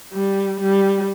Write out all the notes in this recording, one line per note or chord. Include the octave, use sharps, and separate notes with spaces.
G3
G3